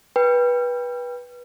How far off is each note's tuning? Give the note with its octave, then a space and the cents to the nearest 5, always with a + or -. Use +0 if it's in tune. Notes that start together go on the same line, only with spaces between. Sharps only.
B4 -20 G5 +20